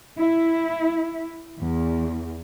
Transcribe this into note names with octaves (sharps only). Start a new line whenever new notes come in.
E4
E2